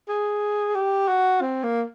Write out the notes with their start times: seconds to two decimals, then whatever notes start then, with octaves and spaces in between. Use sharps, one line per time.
0.08 G#4
0.75 G4
1.08 F#4
1.42 C4
1.64 A#3